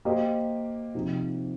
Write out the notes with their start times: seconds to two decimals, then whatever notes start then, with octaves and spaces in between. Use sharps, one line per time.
0.05 A#3 G4 C5 D#5
0.95 C3 F3 D#4